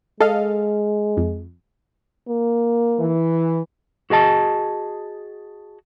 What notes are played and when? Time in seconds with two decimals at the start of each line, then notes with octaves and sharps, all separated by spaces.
0.20 G#3 A4 D#5 F5
1.17 F2
2.28 A#3
2.99 E3
4.10 F#4 G#4 D#5 A5